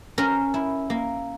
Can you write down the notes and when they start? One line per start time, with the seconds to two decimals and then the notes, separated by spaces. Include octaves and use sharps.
0.18 C#4 A#4
0.54 E4
0.90 A#3